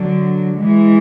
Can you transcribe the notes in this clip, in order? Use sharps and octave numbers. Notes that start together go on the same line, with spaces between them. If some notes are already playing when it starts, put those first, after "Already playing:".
Already playing: D3 F#3
E3 G#3